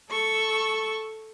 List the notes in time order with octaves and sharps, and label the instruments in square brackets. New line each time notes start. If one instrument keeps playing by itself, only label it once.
[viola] A4 C#6